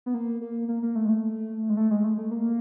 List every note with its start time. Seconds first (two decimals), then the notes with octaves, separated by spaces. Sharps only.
0.06 B3
0.14 A#3
0.41 A#3
0.68 A#3
0.83 A#3
0.95 A3
1.05 G#3
1.09 A3
1.70 G#3
1.77 A3
1.91 G#3
2.04 A3
2.18 A3
2.31 A#3